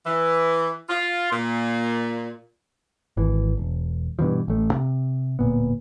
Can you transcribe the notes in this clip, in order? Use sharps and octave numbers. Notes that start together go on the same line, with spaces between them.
E3
F4
A#2
G#1 E3
E1
G2 B2 E3 F3
A1 A3
C3
D1 A#2 B3